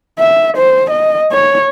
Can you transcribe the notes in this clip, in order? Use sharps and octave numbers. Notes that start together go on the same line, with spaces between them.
E5
C5
D#5
C#5